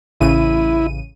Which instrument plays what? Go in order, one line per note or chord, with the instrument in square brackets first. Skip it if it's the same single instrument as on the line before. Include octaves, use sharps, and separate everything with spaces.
[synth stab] A1 C#3 D#7 [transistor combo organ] E4